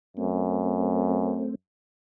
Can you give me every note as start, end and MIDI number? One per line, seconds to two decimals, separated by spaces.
0.17 1.53 42
0.17 1.55 57
0.17 1.55 60